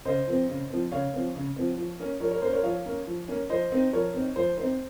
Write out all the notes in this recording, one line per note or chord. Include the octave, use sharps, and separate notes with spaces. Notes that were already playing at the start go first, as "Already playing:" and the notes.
C#3 C5 D#5
F3 C4
C#3
F3 C4
C#3 C#5 F5
F3 C4
C#3
F3 C4
F3
A#3 C#4
F3 A#4 C#5
A#4 C#5
A#3 C#4 C5
A#4 C#5
F3 C#5 F5
A#3 C#4
F3
A#3 C#4
F3 C5 D#5
C4 D#4
F3 A#4 C#5
C4 D#4
F3 C5
C4 D#4 C5